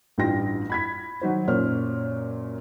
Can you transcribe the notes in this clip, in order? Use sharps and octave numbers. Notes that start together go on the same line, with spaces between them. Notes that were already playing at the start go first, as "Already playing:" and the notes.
A1 G2 D#4 F4 G5 A#6
B5 G#6 B6
D#3 F#3 D#4 F#4 C5
F#2 A#2 C5 C#5 F6